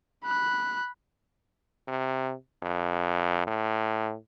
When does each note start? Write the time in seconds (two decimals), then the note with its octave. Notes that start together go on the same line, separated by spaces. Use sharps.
0.24 B5 F#6
1.88 C3
2.63 F2
3.47 A2